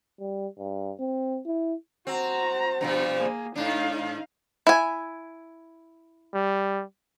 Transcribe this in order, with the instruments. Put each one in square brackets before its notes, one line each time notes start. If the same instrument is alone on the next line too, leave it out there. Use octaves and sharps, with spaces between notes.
[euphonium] G3
G2
C4
E4
[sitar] C4 [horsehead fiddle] F#4 A#5
[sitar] G2 B2 F3
[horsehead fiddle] A#3 G#4
[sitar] G#2 D4 [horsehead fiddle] D#4 F5
[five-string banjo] E4 G#5
[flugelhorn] G3